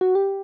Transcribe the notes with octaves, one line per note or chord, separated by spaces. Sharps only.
F#4
G4